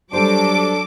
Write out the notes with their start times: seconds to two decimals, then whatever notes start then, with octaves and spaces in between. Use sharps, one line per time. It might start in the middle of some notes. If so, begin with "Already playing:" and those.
0.13 F#3 G3 D4 G4 A4 C5 D6